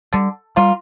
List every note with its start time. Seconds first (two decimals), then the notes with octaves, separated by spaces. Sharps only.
0.13 D3 G3
0.56 G3 A#3 F4